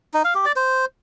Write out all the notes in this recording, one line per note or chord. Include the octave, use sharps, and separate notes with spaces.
D#4
F5
G4
D5
C5